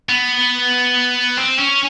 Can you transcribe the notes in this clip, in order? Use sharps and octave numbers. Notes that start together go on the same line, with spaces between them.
B3
C4
C#4